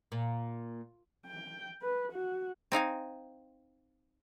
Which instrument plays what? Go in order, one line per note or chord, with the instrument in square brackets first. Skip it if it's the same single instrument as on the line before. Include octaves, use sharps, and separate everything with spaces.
[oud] A#2
[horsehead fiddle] G5
B4
F#4
[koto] C4 D#4 F5 G#5